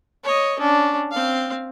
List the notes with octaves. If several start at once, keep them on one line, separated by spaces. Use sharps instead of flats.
C#5 D#5
C#4 D4
C4 F5